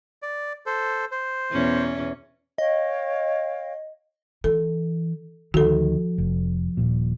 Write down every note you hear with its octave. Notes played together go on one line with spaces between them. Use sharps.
D5
A4 C5
C5
E2 B2 C#4
C#5 D#5 F5 G5
E3 A4
D2 D#3 F3 F#4 A4
F1
D#1 A#2